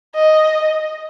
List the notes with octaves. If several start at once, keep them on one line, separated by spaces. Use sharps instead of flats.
D#5